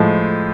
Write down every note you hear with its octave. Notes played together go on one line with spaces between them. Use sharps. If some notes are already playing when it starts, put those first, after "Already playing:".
Already playing: A2 F3 G#3